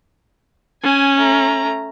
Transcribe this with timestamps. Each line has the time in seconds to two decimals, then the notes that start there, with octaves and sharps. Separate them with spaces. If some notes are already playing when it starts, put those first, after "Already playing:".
0.83 C#4 G#5
1.16 A3 A#5